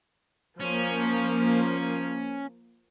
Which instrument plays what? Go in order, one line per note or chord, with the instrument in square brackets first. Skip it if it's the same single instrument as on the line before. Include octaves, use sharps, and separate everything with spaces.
[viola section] F3 A#3 [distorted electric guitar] C#4